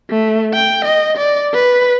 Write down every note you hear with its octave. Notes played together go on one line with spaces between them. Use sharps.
A3
G5
D#5
D5
B4